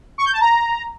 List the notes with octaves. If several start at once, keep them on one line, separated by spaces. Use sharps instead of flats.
C#6
G6
A5
A#5